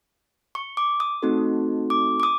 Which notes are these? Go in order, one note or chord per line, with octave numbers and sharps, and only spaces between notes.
C#6
D6
D#6
A3 C4 D#4 F#4 A4
D6
D6
D#6